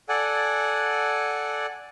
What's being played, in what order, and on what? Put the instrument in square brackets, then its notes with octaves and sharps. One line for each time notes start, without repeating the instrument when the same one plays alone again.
[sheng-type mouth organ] A4 D5 F#5 G#5